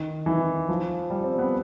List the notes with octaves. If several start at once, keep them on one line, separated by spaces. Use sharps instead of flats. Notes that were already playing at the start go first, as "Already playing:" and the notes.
Already playing: D#3
E3
F3
G3
C4
B3